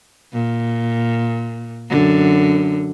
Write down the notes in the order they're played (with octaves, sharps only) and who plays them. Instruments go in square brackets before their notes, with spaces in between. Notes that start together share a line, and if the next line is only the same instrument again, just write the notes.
[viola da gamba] A#2
F#2 D3